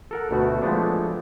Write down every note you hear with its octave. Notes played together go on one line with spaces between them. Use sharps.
A4 A#4 F#5
D2 B2 A3 F#4
F3 G#3 A3 B3 D4